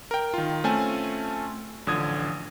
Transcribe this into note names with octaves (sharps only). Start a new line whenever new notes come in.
A#4 G5
D#3 F4
A3 C4 C#4 F4 G#5 A5
A1 D3 F3 D#6 G#6